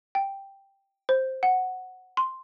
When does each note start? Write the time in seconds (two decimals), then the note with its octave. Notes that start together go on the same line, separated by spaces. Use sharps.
0.15 G5
1.09 C5
1.43 F#5
2.17 C6